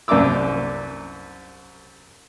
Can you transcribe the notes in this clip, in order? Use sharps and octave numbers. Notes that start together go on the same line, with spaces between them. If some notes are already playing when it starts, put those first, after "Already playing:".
C2 F#2 D4 A#5 D6 E6